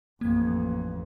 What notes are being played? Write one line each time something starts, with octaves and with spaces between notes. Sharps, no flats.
A1 F2 A#3 G#6